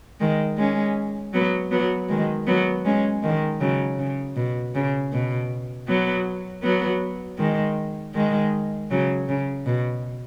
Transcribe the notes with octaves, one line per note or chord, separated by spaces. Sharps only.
D#3 G#3
G#3 C#4
F#3 B3
F#3 B3
D#3 G#3
F#3 B3
G#3 C#4
D#3 G#3
C#3 F#3
C#3
B2
C#3
B2
F#3 B3
F#3 B3
D#3 G#3
D#3 G#3
C#3 F#3
C#3
B2